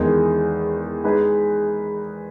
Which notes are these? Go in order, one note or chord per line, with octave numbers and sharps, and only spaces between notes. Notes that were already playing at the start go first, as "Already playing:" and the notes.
Already playing: E2 D#3 G#3 D#4 G#4
G#3 D#4 G#4 B4